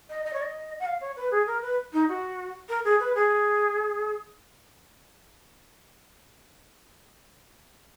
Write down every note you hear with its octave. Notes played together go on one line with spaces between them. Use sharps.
D#5
D#5
C#5
D#5
F#5
F5
C#5
B4
G#4
A#4
B4
D#4
F#4
A#4
G#4
B4
G#4